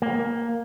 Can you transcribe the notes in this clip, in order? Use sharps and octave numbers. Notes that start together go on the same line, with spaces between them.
A#3